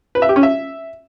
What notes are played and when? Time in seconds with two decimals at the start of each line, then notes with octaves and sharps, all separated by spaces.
0.15 B4
0.22 E5
0.29 G4
0.36 C#4
0.43 E5